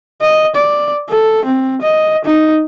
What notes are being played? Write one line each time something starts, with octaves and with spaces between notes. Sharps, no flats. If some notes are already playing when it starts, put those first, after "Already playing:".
D#5
D5
A4
C4
D#5
D#4